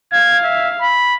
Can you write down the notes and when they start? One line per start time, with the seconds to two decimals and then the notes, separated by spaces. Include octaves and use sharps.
0.12 F5 G#6
0.44 E5
0.82 B5